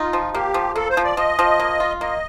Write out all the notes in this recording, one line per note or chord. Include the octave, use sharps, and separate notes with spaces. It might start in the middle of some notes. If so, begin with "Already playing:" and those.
Already playing: D#4 F4
F3
A#3 G4
F3
A#3 A4
C5
F3
D5
F3 D#5
F3
A#3
F4
A#3 D#5